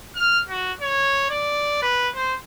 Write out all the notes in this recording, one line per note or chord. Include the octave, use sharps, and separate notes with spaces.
F6
F#4
C#5
D5
B4
C5